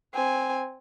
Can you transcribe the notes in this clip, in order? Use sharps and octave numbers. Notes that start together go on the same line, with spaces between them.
C4 G#5